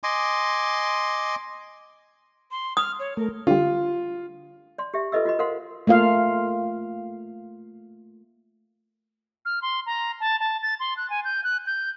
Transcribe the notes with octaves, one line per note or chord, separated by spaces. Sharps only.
D#5 G#5 C6 D6
C6
D#6 F6
C#5
A3 A#4
D3 G3 F4
D5 C6
G4 E5
F4 A4 B4 D#5 E5 E6
F4 F#4 D#5 B5
A#4 C5 F5 F#5 C6
A3 A#3 F4 F5
F6
C6
A#5
A5
A5
A6
C6
F#6
G#5
G6
F#6
G6